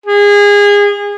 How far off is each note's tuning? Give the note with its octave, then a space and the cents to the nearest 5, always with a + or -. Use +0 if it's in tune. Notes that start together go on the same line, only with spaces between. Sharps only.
G#4 -25